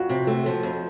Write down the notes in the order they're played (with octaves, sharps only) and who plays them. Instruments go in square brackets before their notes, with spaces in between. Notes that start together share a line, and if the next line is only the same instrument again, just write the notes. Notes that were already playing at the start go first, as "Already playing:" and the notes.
Already playing: [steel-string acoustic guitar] F2 [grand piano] F#4
[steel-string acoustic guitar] C3
A3
F3
F2